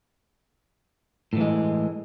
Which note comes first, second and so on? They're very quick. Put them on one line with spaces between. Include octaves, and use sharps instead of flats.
A2 E3 G#3